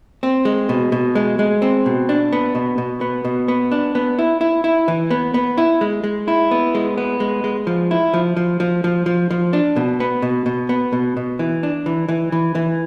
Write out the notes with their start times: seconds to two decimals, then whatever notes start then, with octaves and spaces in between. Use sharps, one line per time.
0.23 C4
0.45 G#3
0.69 B2
0.92 B2
1.15 G#3
1.39 G#3
1.62 C4
1.86 B2
2.09 D4
2.33 B3
2.55 B2
2.78 B2
3.01 B3
3.25 B2
3.48 B3
3.71 D4
3.95 B3
4.19 E4
4.41 E4
4.64 E4
4.88 E3
5.11 B3
5.34 B3
5.58 E4
5.81 G#3
6.04 G#3
6.28 E4
6.51 B3
6.75 G#3
6.97 B3
7.20 G#3
7.44 G#3
7.67 F3
7.91 E4
8.14 F3
8.37 F3
8.60 F3
8.84 F3
9.06 F3
9.31 F3
9.53 D4
9.76 B2
10.00 B3
10.22 B2
10.46 B2
10.69 B3
10.93 B2
11.17 B2
11.39 E3
11.63 D4
11.86 E3
12.09 E3
12.32 E3
12.55 E3